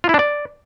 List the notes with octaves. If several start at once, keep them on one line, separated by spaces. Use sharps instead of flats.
F4
E4
D4
D5